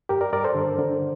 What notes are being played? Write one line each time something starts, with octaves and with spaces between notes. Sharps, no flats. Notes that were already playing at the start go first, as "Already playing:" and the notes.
G2 G4 A#4
A#4 D5
G2 A#4 D5
A4 C5
D3
D3